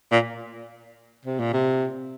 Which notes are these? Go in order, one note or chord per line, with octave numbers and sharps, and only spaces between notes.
A#2
C3
A#2
C3